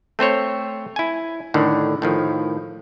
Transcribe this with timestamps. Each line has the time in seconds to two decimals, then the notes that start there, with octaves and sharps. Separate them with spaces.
0.19 A3 C4 C5 C#5
0.96 E4 G#5
1.54 A2 D3 D#3
2.02 A2 D#3 F3